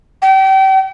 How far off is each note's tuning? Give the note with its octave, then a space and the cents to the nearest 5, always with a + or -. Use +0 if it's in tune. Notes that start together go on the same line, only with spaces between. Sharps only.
G5 -35